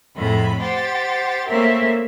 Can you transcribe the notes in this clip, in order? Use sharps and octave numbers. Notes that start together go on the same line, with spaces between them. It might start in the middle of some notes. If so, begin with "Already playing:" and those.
F2 A2 G#3 B5
G4 C5 F#5 A6
A3 A#3 C4 C#4 A#4 E5